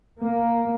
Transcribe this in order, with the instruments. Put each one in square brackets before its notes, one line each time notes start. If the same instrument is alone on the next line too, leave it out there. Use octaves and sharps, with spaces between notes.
[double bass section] A#3